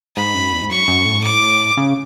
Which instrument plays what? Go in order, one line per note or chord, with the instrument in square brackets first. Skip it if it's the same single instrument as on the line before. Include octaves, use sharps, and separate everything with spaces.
[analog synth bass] G#2 [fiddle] B5
[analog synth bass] F#2
E2
G#2
[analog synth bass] F#2 [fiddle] C#6
[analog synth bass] F#2
A2
G#2
[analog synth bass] A2 [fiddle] D6
[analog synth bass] C#3